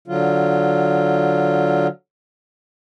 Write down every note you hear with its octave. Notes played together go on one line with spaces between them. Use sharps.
D3 F#3 F4